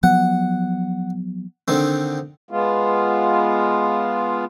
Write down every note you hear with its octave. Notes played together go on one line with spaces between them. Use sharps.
F3 F#3 B3 F#5
D3 D#3 C4
G#3 B3 F4